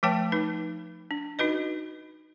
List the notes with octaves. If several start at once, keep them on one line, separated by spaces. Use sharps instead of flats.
F3 A3 B4 C#5 G5 A5
D#4 B4
D4
D#4 F#4 B4 D#5